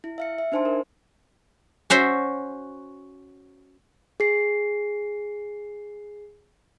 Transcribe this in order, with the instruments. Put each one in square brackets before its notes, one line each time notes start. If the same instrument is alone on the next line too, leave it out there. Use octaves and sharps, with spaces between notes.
[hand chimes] E4
E5 F5 C#7
E5
D4 D#4 C5 G#5 A5 C6
A#4
[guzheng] C#4 F#4 C5 E5
[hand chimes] G#4 C7